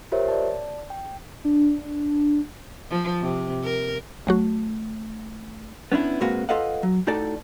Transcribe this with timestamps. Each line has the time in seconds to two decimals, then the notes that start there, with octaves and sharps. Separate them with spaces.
0.12 F4 G4 A#4 C5 C#5 E5
0.28 D5 A5
0.90 G5
1.45 D4
2.91 F3
3.22 C3
3.64 A#4
4.27 B1 F#3 A3 F#4
5.92 B3 C#4 D4 E4
6.21 A#2 G#3 A#3 C4 F#4 B4
6.49 F4 A4 B4 D#5 F5 F#5
6.83 F#3
7.07 A2 D#4 F#4 A4 D5 A5